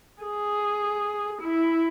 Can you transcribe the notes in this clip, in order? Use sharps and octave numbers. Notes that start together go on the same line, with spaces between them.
G#4
E4